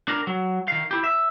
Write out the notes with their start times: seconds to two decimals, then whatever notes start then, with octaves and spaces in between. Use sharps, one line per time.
0.08 D4 A#4
0.27 F#3
0.68 D#3 F5
0.91 E4 G4
1.04 E5